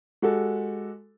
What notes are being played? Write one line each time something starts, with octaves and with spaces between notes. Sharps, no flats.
G#3 F#4 G4 A4